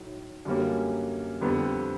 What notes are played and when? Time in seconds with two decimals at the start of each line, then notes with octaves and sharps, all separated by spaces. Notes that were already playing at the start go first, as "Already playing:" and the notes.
Already playing: A2 F#3 D#4
0.45 F#2 D3 G3 A#3 C#4
1.41 F2 D3 G3 B3